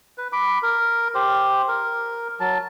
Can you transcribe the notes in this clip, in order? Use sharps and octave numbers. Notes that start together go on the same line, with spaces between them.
B4
B5 D6
A#4
G4 C5
A#4
F#3 A5